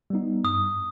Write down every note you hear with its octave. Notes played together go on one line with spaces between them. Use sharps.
G3 B3 D#4
G2 D#6